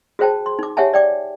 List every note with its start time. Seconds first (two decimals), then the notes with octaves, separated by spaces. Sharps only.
0.19 F#4 G#4 C5 G5 A5
0.46 C6
0.59 D#4 D6
0.77 G4 C#5 E5 F#5 G#5 A5
0.94 D5 G5 D6